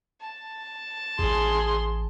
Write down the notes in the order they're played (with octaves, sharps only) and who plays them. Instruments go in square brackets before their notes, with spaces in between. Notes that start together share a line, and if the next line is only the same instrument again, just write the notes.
[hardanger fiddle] A5
[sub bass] A1 [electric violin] G#4 C6